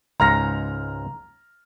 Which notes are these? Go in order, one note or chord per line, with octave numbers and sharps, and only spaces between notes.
C#2 G#2 A#5 F6 A#6